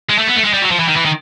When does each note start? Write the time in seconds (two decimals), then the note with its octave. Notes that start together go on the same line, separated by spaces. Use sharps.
0.10 G#3
0.19 A3
0.28 B3
0.36 A3
0.45 G#3
0.53 G3
0.62 F#3
0.71 F3
0.79 E3
0.88 D#3
0.96 E3
1.05 D#3